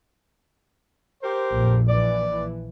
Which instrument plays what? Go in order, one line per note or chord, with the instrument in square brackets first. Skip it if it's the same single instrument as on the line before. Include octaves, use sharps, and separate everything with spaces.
[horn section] G4 A#4 C5
[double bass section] A#1 F2
[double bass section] A#1 E3 [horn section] D5